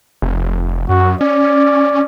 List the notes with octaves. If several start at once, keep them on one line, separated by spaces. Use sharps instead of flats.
F1
F#2 F#4
C#4 D5